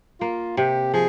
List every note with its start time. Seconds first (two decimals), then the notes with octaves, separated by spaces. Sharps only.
0.20 A#3 F4
0.57 C3 G4
0.94 F3 G#4